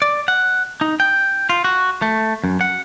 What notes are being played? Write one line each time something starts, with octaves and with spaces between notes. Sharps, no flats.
D5
F#5
D#4
G5
F4
F#4
A3
F#2
F#5